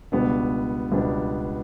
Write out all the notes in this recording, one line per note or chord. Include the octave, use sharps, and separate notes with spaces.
C#2 B2 G3 B3 D4
C#2 B2 G3 B3 D4